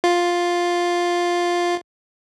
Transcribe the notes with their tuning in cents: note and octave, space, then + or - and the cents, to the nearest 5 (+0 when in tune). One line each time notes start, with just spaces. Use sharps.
F4 +5